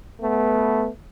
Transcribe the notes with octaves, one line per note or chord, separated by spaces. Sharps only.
A3 B3